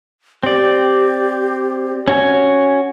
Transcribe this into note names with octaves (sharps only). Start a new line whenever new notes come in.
C4 G4 D5
C#4 F#4 G#5